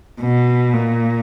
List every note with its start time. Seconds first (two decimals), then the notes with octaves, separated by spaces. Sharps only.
0.21 B2
0.73 A#2